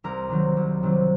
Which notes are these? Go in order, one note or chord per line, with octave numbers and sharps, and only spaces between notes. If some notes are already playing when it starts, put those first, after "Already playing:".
C2 A#4
C3 D#3 F#3
C2
C3 D#3 F#3